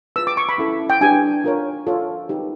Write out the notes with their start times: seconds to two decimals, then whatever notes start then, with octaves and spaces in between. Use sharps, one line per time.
0.16 F4 G#4 B4 E6
0.27 D6
0.37 C#6
0.49 B5
0.58 C#4 E4 A4
0.90 G5
1.01 D4 G4 B4 G#5
1.44 F4 A#4 C#5
1.87 F4 A4 C#5
2.29 D#4 G4 B4